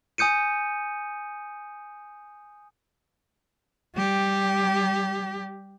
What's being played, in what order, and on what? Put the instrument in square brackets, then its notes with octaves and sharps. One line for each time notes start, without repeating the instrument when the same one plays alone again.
[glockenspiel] G#5 D#6 G6 C#7 D#7
[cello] G3 G4